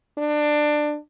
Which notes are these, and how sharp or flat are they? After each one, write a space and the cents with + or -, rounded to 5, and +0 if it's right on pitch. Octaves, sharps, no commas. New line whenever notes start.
D4 +20